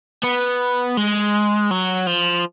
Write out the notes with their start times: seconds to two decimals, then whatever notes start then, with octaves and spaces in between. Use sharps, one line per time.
0.23 B3
0.97 G#3
1.71 F#3
2.07 F3